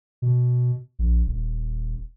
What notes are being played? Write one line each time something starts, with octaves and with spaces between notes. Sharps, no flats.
B2
A#1
D#1